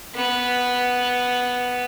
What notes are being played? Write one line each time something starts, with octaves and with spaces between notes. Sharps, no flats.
B3